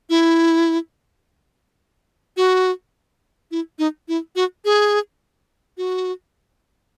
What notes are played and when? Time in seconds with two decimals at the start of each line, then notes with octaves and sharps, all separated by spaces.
0.10 E4
2.37 F#4
3.51 E4
3.79 D#4
4.08 E4
4.36 F#4
4.65 G#4
5.78 F#4